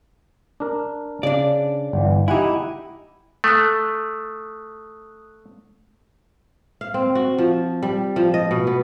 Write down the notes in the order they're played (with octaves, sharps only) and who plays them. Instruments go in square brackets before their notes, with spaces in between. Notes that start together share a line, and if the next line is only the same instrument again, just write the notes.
[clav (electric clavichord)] D4 A#4
[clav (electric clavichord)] C#3 [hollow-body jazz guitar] D4 D5
[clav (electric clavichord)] G1 E3
[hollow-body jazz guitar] D#4 E4 [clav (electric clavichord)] G4 F#5 G#5
[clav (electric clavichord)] A3 [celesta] D#6 F#6
[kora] F5
C4
F#4
F3
G3
F3
D#5
B2
B3